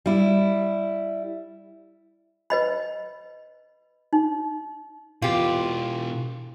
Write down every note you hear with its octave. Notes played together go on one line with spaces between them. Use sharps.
G3 E4
B4 D#5 B5
D#4
B2 E3 F4 G4